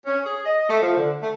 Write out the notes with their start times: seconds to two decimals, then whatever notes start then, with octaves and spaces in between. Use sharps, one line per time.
0.05 C#4
0.24 G#4
0.45 D#5
0.69 A3
0.82 F3
0.96 D3
1.21 A3